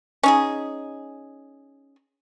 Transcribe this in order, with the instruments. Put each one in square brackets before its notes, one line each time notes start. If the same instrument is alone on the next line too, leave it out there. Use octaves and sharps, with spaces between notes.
[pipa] C#4 D#4 G#4